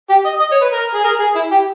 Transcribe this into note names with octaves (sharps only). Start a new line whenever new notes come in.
G4
D#5
D#5
C#5
B4
A#4
G#4
A#4
G#4
E4
G4